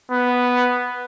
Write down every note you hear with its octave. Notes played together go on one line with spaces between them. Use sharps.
B3